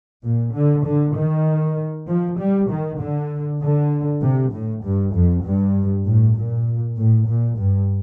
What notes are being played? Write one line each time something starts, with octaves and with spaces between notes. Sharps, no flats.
A#2
D3
D3
D#3
F3
G3
D#3
D3
D3
C3
A2
G2
F2
G2
A2
A#2
A2
A#2
G2